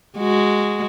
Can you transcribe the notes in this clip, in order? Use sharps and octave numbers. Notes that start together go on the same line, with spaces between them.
G#3 F#4